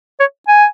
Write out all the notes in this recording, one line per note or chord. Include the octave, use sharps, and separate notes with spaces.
C#5
G#5